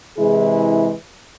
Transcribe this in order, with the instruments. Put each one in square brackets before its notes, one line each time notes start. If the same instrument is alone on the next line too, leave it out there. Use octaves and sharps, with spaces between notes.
[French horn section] C3 E3 G#3 E4 G#4